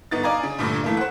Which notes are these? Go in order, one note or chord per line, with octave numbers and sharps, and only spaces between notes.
G1 B3 D#4 A6
D5 D#5 F5 G#5 A#5
C#3
G2 A#2 D3 A3
E3 A3 A#3
C5 F#5